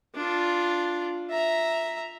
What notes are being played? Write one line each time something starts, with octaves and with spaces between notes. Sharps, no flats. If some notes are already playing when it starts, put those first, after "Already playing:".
D4 F4
E5 A#5